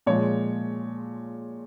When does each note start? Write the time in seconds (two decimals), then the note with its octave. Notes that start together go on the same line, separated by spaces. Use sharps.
0.06 A#2 F3 G#3 C#5